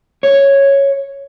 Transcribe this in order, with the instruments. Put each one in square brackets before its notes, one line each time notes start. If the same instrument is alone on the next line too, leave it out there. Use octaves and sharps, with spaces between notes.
[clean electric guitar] C#5